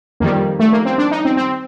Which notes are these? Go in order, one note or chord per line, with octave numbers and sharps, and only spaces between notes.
F2 D#3 G3 A#3
A3
A#3
C4
D4
D#4
C4
C4